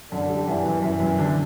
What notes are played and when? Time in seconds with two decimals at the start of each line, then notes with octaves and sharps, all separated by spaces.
0.12 F#2 D3
0.29 G3
0.48 F#2 E3
0.66 F#2
0.82 F#2 E3
1.00 F#2
1.18 D3